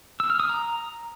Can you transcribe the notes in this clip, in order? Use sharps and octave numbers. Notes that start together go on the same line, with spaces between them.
E6
F6
D#6
A#5